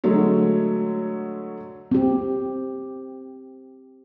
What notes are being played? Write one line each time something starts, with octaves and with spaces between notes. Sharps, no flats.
D3 F#3 G#3 A3 C#5
C4 G4